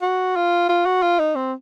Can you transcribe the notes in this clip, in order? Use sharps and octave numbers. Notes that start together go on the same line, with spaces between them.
F#4
F4
F4
F#4
F4
D#4
C4